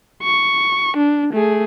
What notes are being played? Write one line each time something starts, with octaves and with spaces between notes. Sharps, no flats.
C#6
D4
A3 G#4